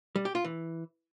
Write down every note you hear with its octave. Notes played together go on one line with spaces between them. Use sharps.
G3
G4
F4
E3